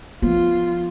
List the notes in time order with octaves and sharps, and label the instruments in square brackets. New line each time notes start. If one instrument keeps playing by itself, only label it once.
[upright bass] F3 B3 [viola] F4